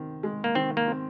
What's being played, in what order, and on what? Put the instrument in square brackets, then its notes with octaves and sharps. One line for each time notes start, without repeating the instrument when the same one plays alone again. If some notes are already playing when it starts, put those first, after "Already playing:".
Already playing: [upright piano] D#3 C4
G#3
[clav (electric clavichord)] A#3
[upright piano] D#3 [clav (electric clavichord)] C4
[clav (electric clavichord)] A#3
[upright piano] C4